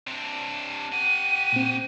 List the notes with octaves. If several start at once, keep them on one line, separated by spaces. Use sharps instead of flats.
C3 D4
G4 F#5 D#7
A#2 C4